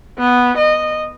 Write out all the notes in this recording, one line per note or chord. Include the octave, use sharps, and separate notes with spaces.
B3
D#5